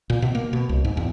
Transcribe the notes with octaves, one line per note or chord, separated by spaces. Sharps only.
A#2
B2
A#3
B2
C2
G#2
E2